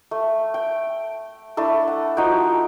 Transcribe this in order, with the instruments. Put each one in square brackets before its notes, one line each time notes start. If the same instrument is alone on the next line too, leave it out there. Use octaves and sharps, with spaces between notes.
[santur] A3
G5
A3 D4 E4 A4
F#5
F3 D#4 F#4 G5